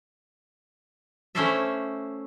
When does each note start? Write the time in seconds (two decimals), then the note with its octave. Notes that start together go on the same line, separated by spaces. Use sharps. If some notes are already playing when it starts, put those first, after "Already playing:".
1.35 A3 C#4 E4 C5 D5 E5